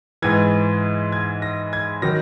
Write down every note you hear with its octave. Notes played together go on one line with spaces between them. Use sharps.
G#2 E3 G#6
G#6
A#6
G#6
D#3 F#3 A#6